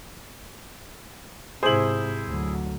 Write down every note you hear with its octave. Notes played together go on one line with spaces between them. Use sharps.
G#2 C3 E4 G#4 C5 F#7
D2 F#3